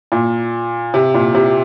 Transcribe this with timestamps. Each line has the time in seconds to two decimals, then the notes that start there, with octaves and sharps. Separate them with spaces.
0.12 A#2
0.94 C3
1.14 A#2
1.35 C3